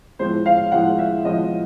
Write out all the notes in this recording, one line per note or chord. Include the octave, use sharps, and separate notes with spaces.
A2 F3 G#3 C5
F5
A2 F3 G#3 F#5
E5
A2 F3 G#3 D#5